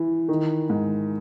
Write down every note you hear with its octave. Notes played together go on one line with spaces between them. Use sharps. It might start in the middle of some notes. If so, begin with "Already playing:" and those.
Already playing: E3
D#3
G#2